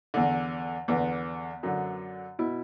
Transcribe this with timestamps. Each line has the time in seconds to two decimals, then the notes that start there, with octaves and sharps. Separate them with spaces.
0.14 E2 D3
0.88 E2 D3 B3
1.63 F#2 D3
2.39 B2 E4